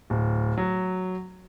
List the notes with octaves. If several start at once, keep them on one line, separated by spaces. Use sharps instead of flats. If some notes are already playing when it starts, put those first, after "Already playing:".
D1
F#3